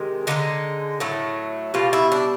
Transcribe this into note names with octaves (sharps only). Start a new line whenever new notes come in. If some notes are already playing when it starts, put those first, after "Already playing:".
Already playing: C3 D#3 G#3
D3 F3 G#3 D#4
A2 F#3 A3
B2 G3 F4
E4
D4